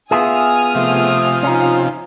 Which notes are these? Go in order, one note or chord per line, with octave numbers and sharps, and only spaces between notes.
B3 F4 G#4 E5 G#5 D#6 F6
C3 F3 A3
C#4 D#4 F4